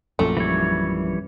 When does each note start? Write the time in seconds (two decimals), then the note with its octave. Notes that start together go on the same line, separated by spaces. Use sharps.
0.19 A#1 F#2 A#2 A3
0.37 E3 G3 C#5